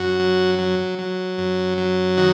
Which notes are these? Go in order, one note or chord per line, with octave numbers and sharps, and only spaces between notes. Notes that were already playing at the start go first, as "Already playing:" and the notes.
Already playing: F#2 F#4
F#3
F#3
F#3
F#2
F#3
D#3 F#4